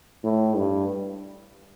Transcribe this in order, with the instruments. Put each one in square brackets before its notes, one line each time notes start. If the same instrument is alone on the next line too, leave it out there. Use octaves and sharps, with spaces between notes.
[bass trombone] A2
G2